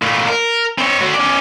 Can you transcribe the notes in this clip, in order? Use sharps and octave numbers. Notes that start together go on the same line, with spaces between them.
A#2 A3
A#4
C4 C#5
A3 F#4
C#4 D5